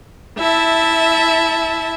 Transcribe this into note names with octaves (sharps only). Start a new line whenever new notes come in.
E4 E5 A5